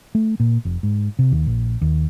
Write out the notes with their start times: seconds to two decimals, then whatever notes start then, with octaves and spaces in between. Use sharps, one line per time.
0.15 A3
0.40 A#2
0.65 F1
0.83 G#2
1.19 C3
1.32 D#2
1.46 A#1
1.81 D#2